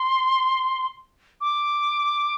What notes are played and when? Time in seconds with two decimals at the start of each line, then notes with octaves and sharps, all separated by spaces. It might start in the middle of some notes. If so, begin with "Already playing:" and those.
Already playing: C6
1.41 D6